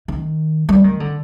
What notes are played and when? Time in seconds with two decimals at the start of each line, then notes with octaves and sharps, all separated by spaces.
0.08 D#3
0.69 G3
0.84 D#3
1.00 D3